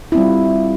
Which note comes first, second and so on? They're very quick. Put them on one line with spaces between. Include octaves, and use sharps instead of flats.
E4 C4 G3 F4